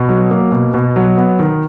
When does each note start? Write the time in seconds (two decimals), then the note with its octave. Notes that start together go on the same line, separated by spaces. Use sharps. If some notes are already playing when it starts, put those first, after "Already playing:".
Already playing: B2
0.09 F#3
0.31 A#3
0.52 B2
0.74 B2
0.96 F#3
1.17 B3
1.39 D#3